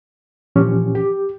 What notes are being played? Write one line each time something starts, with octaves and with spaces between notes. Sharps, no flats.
A#2 E3 F3 C#4 G4
G4